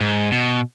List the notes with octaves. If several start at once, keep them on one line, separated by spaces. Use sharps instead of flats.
G#2
B2